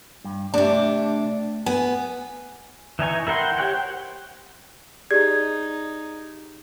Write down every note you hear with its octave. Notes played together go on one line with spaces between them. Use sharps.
G2
C3 A3 D4 G4 A5
B3 G#5
E3 D#4 G#5 C#6
E4 A#4 F#5 G5 C6
G4 C5 C#5 F#5 G5
D#4 G4 G#4 D5 G#6